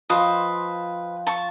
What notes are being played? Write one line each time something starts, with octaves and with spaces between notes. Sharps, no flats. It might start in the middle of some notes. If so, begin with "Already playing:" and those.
F3 B4 C5 D#5 G5
A5 C#6